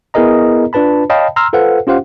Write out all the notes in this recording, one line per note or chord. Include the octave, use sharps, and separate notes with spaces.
B3 E4 G#4 A#4 D#5 A#5
D4 F4 B4 A5 B5
C#5 D#5 F5 G5 A5 B5
A#5 C6 E6 F6
F4 A4 B4 C5 F5 F#5
C#4 F4 G4 C5 F5 F#5